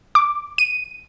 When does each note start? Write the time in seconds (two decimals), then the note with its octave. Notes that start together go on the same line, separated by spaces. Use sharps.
0.15 D6
0.58 D#7